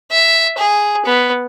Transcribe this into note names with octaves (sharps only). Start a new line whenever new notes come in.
E5
G#4
B3